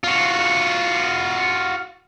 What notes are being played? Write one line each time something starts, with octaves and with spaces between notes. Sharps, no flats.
F4 F#4